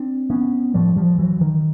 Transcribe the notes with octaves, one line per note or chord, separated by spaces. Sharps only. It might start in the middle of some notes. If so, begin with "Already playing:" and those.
Already playing: C4 D4
B3 C#4
A2 F3 G3
F3 G3
E3 F#3
D#3